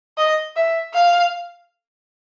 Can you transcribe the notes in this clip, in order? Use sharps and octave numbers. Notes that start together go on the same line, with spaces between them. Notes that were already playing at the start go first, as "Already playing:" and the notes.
D#5
E5
F5